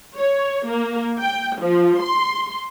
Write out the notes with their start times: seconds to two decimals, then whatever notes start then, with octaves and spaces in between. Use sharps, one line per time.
0.17 C#5
0.67 A#3
1.21 G5
1.60 F3
2.00 C6